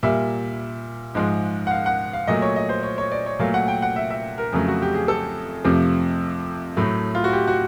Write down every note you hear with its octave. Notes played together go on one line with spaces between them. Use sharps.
A#2 G3 E5
G#2 F3 G#3
F#5
F5
F#5
F5
A#2 F#3 A3 D#5
C#5
D#5
C5
C#5
C#5
D5
C#5
A#2 F#3 A3 F5
F#5
G5
F#5
E5
E5
A#4
F2 C#3 F#3 A3
F#4
G4
G#4
A4
F2 C3 F3 A3
A2 F#3 A3
F4
F#4
G4
F#4